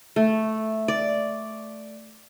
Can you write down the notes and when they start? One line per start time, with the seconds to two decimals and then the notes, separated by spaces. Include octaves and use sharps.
0.16 A3
0.88 D5